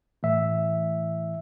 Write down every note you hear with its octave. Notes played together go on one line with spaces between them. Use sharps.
A2 E3 A3 E5